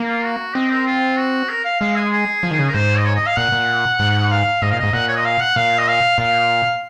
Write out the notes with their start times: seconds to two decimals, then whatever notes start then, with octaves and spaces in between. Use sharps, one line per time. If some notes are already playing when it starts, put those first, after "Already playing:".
Already playing: A#3
0.08 F4
0.24 F#4
0.55 C4 D#5
0.71 A#4
0.87 F4
1.17 F#4
1.49 A#4
1.65 F5
1.80 G#3 F5
1.96 G#4
2.11 G#4
2.43 F3
2.51 D#3
2.59 C#3
2.68 A#4
2.74 G#2 C5
2.98 D#5
3.06 C#5
3.16 D#5
3.26 F5
3.37 A#2 F#5
3.52 A#2
3.99 G#2
4.31 F5
4.62 G#2 D#5
4.71 A#2 F5
4.79 G#2 D#5
4.93 A#2 F#5
5.08 C#5
5.16 D#5
5.25 F5
5.40 F#5
5.56 A#2 F5
5.78 D#5
5.88 F5
6.18 A#2 F5